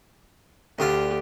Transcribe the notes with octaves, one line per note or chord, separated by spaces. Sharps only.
D2 D3 F4 G4